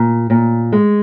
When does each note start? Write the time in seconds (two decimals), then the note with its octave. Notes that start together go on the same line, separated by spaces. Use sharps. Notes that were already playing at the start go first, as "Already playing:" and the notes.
Already playing: A#2
0.30 A#2
0.72 G#3